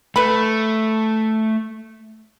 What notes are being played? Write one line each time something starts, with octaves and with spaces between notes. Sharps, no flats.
A3 B4 B5